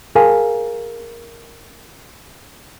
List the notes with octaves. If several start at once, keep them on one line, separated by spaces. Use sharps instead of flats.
G#4 A#4 F5 G#5